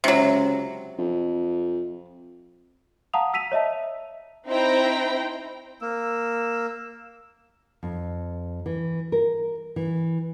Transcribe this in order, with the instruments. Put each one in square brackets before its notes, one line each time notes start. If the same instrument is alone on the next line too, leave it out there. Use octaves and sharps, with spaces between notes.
[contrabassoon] C#2 [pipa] C3 F#3
[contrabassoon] F2
[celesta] F5 F#5 A5 A#5 D#6 F7
E6 B6 D#7 F7
C#5 D#5 E5 A5
[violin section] C4 D#4 E4 C5 G5 A#5
[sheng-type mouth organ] A#3 [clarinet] E6
[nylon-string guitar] F2
E3
A#4
E3